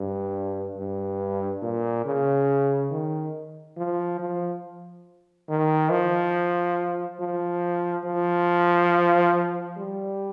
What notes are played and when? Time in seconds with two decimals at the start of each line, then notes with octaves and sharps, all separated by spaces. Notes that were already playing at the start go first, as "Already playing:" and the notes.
Already playing: G2
0.77 G2
1.62 A#2
2.05 C#3
2.91 D#3
3.77 F3
4.20 F3
5.49 D#3
5.91 F3
7.20 F3
8.05 F3
9.77 G3